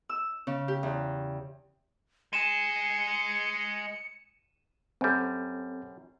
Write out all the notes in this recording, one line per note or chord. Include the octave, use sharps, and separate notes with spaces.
E6
C#3
G4
E2
G#3 G#4 C#7 D#7 E7
F#2 G3 C4 A4